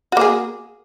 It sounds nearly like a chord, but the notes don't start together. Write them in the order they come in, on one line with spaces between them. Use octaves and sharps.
F#4 A#3 G#4